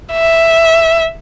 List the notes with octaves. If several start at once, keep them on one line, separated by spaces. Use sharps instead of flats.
E5